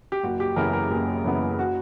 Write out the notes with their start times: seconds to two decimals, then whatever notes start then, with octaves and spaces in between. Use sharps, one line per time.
0.12 G4
0.23 F#1 F#4
0.40 G4
0.56 F#2 C#3 E3 B3 A#4
0.73 A#4
0.90 F#1 G4
1.24 F#2 C#3 E3 B3
1.59 F#4